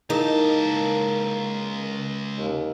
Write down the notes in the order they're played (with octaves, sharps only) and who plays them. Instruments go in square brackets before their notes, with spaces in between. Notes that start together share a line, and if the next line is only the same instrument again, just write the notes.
[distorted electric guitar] C#2 A5 [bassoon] A#3 [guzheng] D#4 [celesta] E4 G#4 A#4
[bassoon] D#2